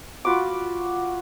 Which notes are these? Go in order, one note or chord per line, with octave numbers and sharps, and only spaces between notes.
F4 F#4 B5 D6